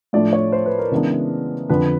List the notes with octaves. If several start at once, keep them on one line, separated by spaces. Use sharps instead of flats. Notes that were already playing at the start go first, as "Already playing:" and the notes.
A2 F3 A3 D4 D5
C#5
C5
B4
A#4
C#3 E3 G#3 B3 D4
F2 D3 F3 B4